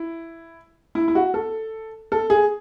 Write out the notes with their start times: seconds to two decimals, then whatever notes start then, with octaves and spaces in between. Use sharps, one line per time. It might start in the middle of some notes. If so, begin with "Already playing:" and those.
Already playing: E4
0.95 E4
1.08 E4
1.15 F#4
1.34 A4
2.12 A4
2.30 G#4